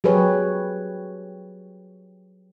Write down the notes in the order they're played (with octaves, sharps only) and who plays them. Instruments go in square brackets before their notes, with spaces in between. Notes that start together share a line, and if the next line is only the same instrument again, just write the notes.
[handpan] F#3 G4 G#4 B4 C#5